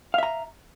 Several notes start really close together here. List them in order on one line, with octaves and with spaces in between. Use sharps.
F5 E5 A#5